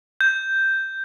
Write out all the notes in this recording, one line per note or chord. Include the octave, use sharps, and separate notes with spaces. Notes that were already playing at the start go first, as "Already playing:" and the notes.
G6